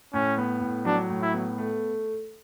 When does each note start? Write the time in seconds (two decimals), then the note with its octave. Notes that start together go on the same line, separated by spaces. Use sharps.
0.13 A2 C#4
0.38 B3
0.61 A2
0.85 F#3 D4
1.10 A2
1.22 E4
1.34 B3
1.58 A3